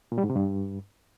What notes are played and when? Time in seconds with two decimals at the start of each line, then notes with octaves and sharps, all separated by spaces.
0.12 A#2
0.18 G3
0.24 G#2
0.30 C3
0.36 G2